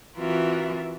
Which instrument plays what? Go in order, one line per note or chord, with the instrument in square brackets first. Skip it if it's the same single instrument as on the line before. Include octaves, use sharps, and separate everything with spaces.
[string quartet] E3 C4 F4 F#4 A#4 E5